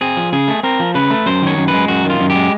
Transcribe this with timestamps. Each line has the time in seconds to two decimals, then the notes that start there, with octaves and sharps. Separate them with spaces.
0.01 C4 G#4
0.17 F3
0.32 C#3 G#4
0.48 A3
0.63 C4 A#4
0.80 F3
0.95 C#3 B4
1.10 A3
1.26 F#2 C5
1.42 D#3 C#5
1.58 F#2
1.68 B4
1.74 G#3
1.88 F#2 F#4
2.04 D#3
2.10 F4
2.20 F#2
2.30 G4
2.36 G#3